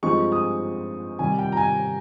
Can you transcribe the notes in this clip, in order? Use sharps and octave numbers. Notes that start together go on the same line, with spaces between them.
G2 F3 G#3 C4 D#4 C#6
D#6
C3 D#3 G3 G#5
G5
A#5
G#5